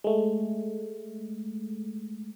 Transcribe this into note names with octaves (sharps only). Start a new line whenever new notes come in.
G#3 A3